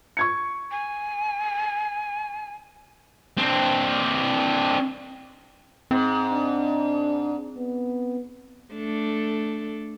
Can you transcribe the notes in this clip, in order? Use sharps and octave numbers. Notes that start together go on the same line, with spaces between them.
C#6 G#6 C#7
G#5
C4 D4
G#2 C4
D4
B3
A3 D4 A4